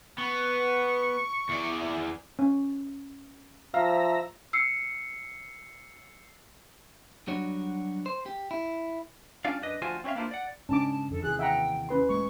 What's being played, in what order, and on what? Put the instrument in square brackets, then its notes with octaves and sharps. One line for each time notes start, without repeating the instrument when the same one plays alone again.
[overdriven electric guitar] B3 [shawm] C#6
[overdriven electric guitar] E2 D5
[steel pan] C#4
[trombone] F3 [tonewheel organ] E5 A#5 [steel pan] F5
[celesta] E6 C7 C#7
[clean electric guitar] F#3 G3 D4 F#4 C#5
C5
G4
E4
G3 C#4 D4 F4 D5 F5
F#2 D4 B4 D#5
D2 F3 F4 F#4 C5 G#5
C4 C#4 C5 E5 F5
A#3 B3 D4 E4 F4 C5
D5 F#5
[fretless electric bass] G#2 C#3 [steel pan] C#4 D4 D6 [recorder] A5
[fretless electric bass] F2 D3 [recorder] A4
[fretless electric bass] D#2 C3 E3 [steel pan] G#4 [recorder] F#6
[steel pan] E5 F#5 A#5 [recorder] G5
[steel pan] C#4 B4 C6
[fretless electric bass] D#1 G#3 A3 [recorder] C#6